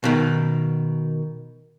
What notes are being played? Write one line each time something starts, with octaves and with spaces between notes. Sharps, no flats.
B2 D#3